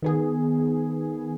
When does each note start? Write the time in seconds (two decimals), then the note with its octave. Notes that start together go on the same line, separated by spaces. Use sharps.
0.02 D#3 B3 G#4